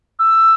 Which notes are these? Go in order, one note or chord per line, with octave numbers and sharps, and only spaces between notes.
E6